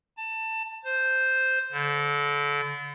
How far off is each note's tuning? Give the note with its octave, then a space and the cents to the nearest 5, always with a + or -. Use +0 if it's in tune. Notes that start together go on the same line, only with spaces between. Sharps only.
A5 +20
C5 -5
D3 -30